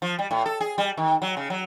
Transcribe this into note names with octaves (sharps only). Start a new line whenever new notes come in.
F3
G3
A2
A4
G#4
G3
D#3
F#3
C#3
F#3